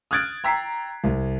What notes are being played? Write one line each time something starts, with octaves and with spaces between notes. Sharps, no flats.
D#6 F6 F#6 G#6 A6 D7
G5 A#5 E6 B6 C7
C2